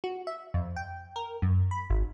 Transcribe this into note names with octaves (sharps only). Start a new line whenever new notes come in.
F#4
E5
F2
G5
A#4
F#2
B5
G#1